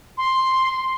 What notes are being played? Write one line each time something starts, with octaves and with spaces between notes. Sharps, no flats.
C6